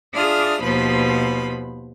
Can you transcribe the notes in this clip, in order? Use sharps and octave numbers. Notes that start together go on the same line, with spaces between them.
D4 F4 G#4 E5 D#6 F6
D#2 B2 F3 B4 C5 B5